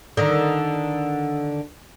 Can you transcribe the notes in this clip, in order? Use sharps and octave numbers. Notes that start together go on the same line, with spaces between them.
D3 D#3